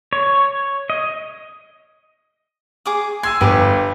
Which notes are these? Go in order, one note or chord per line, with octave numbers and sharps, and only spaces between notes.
C#5
D#5
G#4 D6 D#6
G#5 C6 E6 G#6
G1 G4 B4 B5 D6